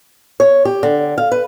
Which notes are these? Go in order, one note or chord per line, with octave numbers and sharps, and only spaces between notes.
C#5
G4
D3
F5
B4